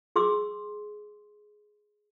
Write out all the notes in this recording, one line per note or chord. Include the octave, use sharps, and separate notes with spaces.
G#4 C6 D6 E6